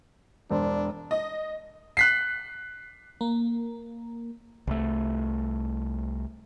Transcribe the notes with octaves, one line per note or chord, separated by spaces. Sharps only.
E1 D4 C5
D#5
F#6 B6 C7
A#3
C2 A3